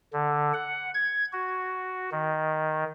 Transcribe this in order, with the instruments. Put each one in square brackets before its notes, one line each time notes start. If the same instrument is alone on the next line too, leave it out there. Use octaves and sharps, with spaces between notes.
[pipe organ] D3
F#5
G#6
F#4
D#3